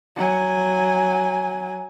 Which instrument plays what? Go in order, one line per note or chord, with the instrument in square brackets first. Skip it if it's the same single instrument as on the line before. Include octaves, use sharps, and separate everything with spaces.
[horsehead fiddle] F#3 G#5